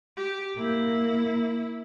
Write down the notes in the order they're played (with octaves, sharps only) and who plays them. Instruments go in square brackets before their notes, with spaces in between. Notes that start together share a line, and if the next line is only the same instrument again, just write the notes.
[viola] G4
[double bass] A#3 [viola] E4